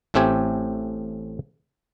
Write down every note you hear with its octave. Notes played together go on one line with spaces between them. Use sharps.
A1 A2 A3 C4 G4 G#5